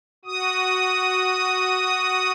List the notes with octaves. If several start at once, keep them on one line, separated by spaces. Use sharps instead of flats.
F#4 D#6